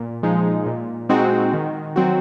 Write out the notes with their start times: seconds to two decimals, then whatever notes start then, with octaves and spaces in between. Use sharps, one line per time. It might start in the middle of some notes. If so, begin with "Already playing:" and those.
Already playing: A#2
0.23 F3 G#3 D#4
0.66 A#2
1.09 G#3 C4 D#4 F#4
1.53 D#3
1.96 F#3 C4 F#4